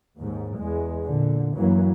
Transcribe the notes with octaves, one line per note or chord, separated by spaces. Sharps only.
D#2 G#2
E2 G#3
A#2 D3
F#2 E3 F#3 A#3